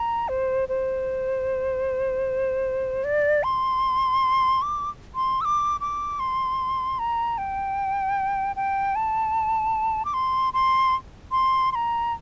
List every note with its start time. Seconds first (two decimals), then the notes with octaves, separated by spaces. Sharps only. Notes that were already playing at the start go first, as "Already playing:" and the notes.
Already playing: A#5
0.29 C5
0.69 C5
3.04 D5
3.43 C6
4.62 D6
5.15 C6
5.41 E6
5.45 D6
5.81 D6
6.19 C6
6.99 A#5
7.38 G5
8.56 G5
8.95 A5
10.05 D6
10.14 C6
10.53 C6
11.31 C6
11.72 C6
11.75 A#5